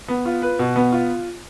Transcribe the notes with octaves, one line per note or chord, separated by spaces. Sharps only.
B3
F4
B4
B2
B3
F4